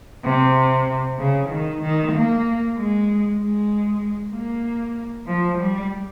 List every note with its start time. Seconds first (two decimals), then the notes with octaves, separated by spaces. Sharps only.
0.24 C3
1.19 C#3
1.49 D#3
1.82 D#3
2.12 A#3
2.76 G#3
3.39 G#3
4.32 A#3
5.27 F3
5.58 G3